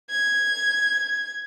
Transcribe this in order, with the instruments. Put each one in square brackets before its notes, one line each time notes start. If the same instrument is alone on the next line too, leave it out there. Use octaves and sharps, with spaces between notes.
[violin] G#6